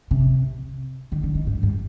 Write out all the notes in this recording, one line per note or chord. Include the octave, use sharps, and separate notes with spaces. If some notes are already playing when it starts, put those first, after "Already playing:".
C3
D#3
D3
D#3
G#2
G2